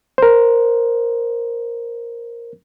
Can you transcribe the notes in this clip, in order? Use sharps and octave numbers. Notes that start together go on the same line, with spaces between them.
A#4 C5